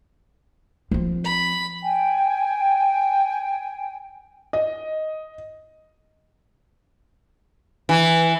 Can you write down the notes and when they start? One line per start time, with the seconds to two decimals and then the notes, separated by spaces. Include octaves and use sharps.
0.91 F3 C4
1.25 B5
1.82 G5 G#5
4.53 D#5
7.89 E3